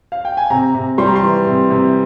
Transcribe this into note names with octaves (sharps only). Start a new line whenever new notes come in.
F5
G5
G#5
C3 A#5
C3
G3 C6
A#5
C6
E3
C3
C3